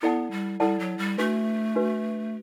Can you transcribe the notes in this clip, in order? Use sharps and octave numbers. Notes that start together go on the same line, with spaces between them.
B3 E4 A4 D5 F#5 A5
G3
G3 E4 A4 D5 F#5 A5
F#3
G3
A3 D4 F#4 B4
D4 F#4 B4